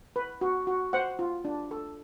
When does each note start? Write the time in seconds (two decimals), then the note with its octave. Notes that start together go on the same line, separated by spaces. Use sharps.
0.16 B4
0.41 F#4
0.67 F#4
0.93 C5 F#5
1.19 F4
1.45 D4
1.71 A4